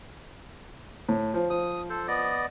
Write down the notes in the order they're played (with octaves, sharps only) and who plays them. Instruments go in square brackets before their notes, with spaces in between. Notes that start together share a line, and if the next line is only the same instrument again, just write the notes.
[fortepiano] A2
F3
[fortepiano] F3 [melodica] D#6
[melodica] A4 C5
B3 D5 D#5